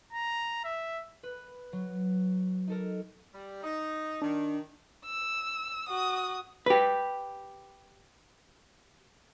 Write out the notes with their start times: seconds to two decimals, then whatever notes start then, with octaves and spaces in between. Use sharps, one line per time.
0.13 A#5
0.64 E5
1.23 B4
1.73 F#3
2.67 D#4 A4 A#4
3.33 G3
3.63 D#4
4.22 D#3 D4
5.05 E6
5.88 F#4 D#6
6.66 G4 B4